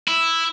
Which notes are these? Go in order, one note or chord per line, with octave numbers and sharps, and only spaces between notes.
E4